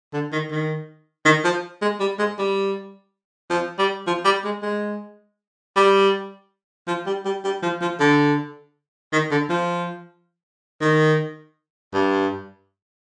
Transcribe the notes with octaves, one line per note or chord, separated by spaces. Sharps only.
D3
D#3
D#3
D#3
F3
G#3
G3
G#3
G3
F3
G3
F3
G3
G#3
G#3
G3
F3
G3
G3
G3
F3
F3
D3
D#3
D3
F3
D#3
G2